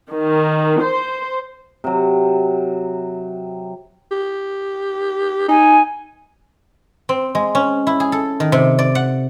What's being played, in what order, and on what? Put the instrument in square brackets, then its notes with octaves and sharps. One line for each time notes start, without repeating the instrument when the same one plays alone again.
[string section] D#3
C5
[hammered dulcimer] C3 F#3
[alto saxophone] G4
[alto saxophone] D#4 [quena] G#5
[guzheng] C4
G#3
C#4
E4
G#4
A4
D#3
C3
D5
F#5